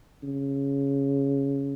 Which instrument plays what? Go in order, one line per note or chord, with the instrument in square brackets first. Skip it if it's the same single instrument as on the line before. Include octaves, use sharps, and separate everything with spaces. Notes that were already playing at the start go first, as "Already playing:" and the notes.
[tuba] C#3